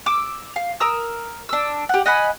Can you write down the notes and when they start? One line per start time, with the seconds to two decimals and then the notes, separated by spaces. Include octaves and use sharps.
0.06 D6 E6
0.56 F5
0.80 A#4 A#5 D#6 E6
1.49 D4 E6
1.89 G4 F#5
2.06 D#5 F#5 G#5 B5